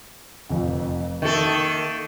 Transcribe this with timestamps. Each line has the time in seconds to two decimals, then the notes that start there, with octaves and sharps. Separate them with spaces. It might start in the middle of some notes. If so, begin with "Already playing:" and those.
0.49 F1 F2 F4
1.22 D#3 A#3 A4 E5 C#6